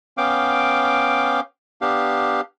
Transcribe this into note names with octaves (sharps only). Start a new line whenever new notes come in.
B3 C#4 F5 G5 D6
B3 D4 G4 F5